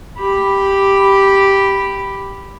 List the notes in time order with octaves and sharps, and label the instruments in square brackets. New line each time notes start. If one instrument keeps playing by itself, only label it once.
[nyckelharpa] G4 B5